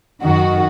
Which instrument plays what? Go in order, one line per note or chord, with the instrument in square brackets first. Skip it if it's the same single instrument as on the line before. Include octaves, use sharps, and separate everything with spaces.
[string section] F#2 D#3 F#4